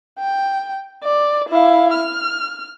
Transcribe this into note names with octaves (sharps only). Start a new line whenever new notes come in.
G5
D5
E4 F5
F6